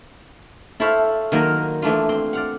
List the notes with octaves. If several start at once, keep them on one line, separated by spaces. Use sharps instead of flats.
E4 A4 C5 C#5 E5 F5
D#3 F#3 A#3 F4 A#4
E3 A3 D4 F4
C4 C6
D5 F5 F#5